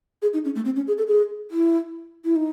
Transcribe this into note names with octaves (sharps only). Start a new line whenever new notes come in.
G#4
D#4
C#4
A3
C4
C#4
G#4
A4
G#4
E4
E4
D#4